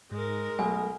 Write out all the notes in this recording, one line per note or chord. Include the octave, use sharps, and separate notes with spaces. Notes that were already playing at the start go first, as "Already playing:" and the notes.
G#2 G#3 A#4
B1 A3 G#5